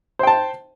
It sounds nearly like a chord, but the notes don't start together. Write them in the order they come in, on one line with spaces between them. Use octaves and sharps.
C5 G5 A5